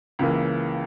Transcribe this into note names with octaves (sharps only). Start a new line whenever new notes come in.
C#2 C#3 E3 A#3